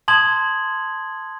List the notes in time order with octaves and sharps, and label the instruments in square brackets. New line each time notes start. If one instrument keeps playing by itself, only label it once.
[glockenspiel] A5 C6 D#6 G#6 F#7